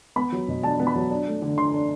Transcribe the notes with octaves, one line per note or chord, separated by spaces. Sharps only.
B3 B5
F#3
B2
D4 A5
B3
B5
F#3
D4
A3
D3
D3 C6
D4